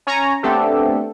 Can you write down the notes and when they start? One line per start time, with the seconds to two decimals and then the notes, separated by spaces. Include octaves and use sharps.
0.07 C#4 C#5 G#5 A#5
0.43 A3 B3 C4 D4 G4 A4